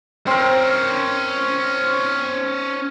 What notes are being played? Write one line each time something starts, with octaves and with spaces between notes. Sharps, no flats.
C4 C#4 A#4 C5